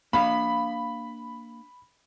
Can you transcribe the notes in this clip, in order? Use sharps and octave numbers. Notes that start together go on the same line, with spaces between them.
A#3 D4 F5 B5